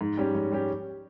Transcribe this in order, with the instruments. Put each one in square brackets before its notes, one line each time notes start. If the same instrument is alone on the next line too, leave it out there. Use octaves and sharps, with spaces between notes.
[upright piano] G#2
G3 C#4 G4
G#2
G3 C#4 G4